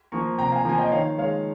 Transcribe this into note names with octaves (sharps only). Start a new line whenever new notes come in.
F3 A#3 A#5 C#6
C3 G5 A#5
F5 G#5
F3 A#3 G#5
D#5 G5
D#3 C#5 F5
G#3 C#5 F5